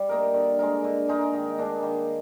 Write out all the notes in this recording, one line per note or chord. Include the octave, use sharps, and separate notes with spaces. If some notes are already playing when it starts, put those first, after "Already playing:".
Already playing: G3
A#3 D#4 A#4
D3
G#3 D#4 A#4
D3
G#3 D#4 A#4
D#3
A#3 D4 G#4
D#3